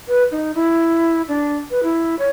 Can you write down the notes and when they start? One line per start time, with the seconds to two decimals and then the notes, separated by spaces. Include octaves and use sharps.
0.08 B4
0.31 D#4
0.55 E4
1.28 D4
1.71 B4
1.83 E4
2.19 C#5